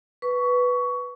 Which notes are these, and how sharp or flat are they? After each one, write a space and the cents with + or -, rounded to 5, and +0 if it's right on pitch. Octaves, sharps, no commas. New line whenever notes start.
B4 +0 C#6 +20